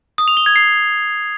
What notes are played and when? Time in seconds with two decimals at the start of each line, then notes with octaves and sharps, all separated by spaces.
0.18 D#6
0.28 F7
0.37 G7
0.46 G#6
0.56 C7